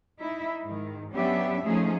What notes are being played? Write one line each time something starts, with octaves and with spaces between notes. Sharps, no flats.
D#4 E4 E5
G#2 D#3
F#3 B3 C#4 D4 G4 E5
F3 A3 C#4 D#4 G#4